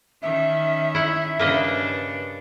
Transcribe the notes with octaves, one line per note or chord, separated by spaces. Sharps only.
D#3 C#4 E5
E4 F#5
G2 C#3 A#3 D4 B4 D#5